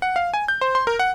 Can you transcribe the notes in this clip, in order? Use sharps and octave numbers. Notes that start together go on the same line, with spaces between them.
F#5
F5
G#5
G6
C5
C6
A#4
F#5